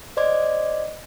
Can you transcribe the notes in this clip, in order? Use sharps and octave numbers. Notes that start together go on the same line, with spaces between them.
C5 D5 D#5 C6 D6 G#6